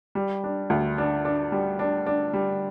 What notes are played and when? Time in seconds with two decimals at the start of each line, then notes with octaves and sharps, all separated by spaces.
0.15 G3
0.44 D4
0.70 D2
0.98 D4
1.25 D4
1.52 G3
1.79 D4
2.06 D4
2.34 G3